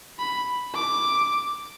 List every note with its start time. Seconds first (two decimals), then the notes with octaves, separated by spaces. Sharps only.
0.19 B5
0.75 D6